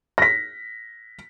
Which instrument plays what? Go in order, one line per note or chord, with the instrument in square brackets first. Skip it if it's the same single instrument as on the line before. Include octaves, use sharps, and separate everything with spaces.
[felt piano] A#6 B6